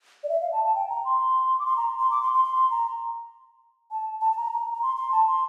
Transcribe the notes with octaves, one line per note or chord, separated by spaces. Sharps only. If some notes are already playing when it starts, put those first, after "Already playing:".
D5
E5
F5
A5
A5
G5
A#5
C6
D6
C6
A#5
C6
D6
C6
C6
C6
C6
A#5
A5
A5
A5
A#5
A#5
A#5
C6
C6
A5
C6